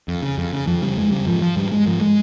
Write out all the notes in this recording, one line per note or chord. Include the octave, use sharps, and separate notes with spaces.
F2
C#3
F2
C#3
F2 F3
C#3 G3
F2 G#3
C#3 G3
G#2 F3
F3
G#2 G3
G#3
G#2 F3
G#3